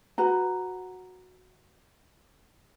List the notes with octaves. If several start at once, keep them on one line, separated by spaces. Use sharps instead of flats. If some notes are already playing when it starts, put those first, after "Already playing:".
F#4 B4 A#5